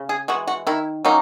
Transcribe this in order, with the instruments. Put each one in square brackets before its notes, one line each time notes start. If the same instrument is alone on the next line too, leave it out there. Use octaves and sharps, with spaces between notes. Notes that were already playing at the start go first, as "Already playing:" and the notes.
Already playing: [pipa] C#3
G#4
E3 G#3 F#4
F#4
D#3 E4
F#3 A#3 C#4 D#4